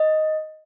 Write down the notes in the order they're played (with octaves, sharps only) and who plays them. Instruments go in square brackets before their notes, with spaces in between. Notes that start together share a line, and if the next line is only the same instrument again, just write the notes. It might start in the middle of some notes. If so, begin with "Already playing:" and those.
Already playing: [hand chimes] D#5